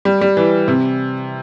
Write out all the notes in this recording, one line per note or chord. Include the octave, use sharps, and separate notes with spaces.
G3
G3
E3
C3